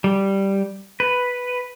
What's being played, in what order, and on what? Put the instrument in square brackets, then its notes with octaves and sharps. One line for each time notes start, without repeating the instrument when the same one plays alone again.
[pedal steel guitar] G3
B4